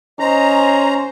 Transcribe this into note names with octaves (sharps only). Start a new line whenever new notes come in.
C#4 C5 D#5 A#5